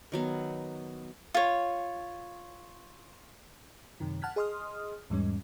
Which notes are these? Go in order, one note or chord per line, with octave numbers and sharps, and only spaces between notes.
D#3 F#3 B3
F4 C#5
F#2 C3 D#3
F#5 A5 F6 F#6 G#6 B6
G#4 D#5 C6 D#6 F6
E2 G#2 G3 C#4